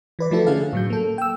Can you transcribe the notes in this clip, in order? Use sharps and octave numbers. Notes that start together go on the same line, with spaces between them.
E3 B4 D5
F3 A3 E4 F#4 A4
D3 C#4 G#4 F5
A2 F#3 G6
A#3 A4
G5 E6